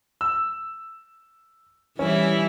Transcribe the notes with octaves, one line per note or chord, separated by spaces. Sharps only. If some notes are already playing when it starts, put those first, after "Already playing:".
E6
E3 G3 C#4 E4